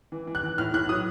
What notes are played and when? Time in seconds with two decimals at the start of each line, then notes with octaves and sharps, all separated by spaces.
0.12 E3
0.27 E3
0.35 F#6
0.43 E3
0.58 A2 F6
0.74 A2 F#6
0.89 F#3 D#6